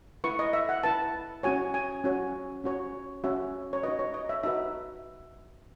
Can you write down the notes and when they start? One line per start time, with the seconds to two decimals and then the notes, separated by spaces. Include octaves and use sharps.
0.24 E4 B4 C#6
0.39 D#5
0.53 E5
0.69 F#5
0.83 E4 B4 A5
1.43 C#4 F#4 C#5 G#5
1.74 G#5
2.04 C#4 F#4 C#5
2.64 C#4 F#4 C#5
3.24 C#4 F#4 C#5 E5
3.73 C#5
3.83 D#4 F#4 B4 D#5
3.99 C#5
4.14 D#5
4.29 E5
4.43 D#4 F#4 B4 E5